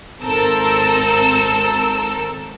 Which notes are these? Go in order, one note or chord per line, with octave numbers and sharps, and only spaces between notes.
G#1 C4 A4 A#4 E6